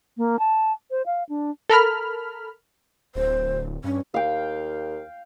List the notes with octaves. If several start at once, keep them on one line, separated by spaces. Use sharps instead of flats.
A#3
A5
C5
F5
D4
A4 A#4 B5 F6
D1 C5
G2 C#4
D#2 F5 G5